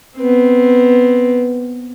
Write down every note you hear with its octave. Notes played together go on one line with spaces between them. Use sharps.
B3 C4